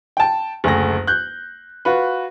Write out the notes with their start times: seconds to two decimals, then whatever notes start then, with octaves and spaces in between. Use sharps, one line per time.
0.17 G5 A5
0.64 F#1 D2 A3 A#6
1.07 F#6 G6
1.85 F4 F#4 B4